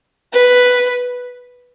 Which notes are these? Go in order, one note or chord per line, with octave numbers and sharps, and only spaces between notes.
B4